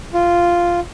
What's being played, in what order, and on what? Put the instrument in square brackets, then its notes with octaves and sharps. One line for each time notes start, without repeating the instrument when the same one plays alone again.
[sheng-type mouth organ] F4